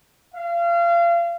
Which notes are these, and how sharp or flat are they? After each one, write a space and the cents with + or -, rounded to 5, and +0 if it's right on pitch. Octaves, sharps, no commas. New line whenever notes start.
F5 -30